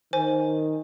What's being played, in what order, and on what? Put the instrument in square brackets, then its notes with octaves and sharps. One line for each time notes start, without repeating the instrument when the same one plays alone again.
[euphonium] D#3 [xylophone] C5 G#5